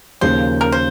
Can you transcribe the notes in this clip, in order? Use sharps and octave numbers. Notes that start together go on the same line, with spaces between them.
D#2 C#3 F3 A#3 C5
A#4
C5